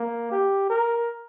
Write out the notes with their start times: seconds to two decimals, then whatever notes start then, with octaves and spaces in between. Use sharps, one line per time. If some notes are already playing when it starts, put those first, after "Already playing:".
Already playing: A#3
0.32 G4
0.70 A#4